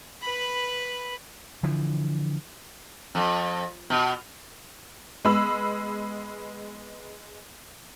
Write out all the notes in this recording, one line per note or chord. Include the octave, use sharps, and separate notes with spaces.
B4 B5
D3 E3 F3
F2
B2
G#3 B3 B5 E6